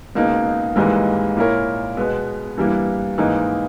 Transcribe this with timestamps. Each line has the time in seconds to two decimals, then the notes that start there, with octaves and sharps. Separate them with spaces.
0.15 C#2 B2 A#3 D#4
0.76 G#1 G#2 E3 G3 A#3
1.36 A#2 A#3 E4 A#4 C#5
1.97 B2 G#3 B3
2.57 G2 E3 G3 A#3 E4
3.18 G#1 G#2 E3 A#3 D#4